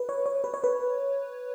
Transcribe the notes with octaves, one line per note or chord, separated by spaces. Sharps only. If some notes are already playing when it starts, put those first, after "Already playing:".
Already playing: B4
C#5
C#5
B4
C#5
B4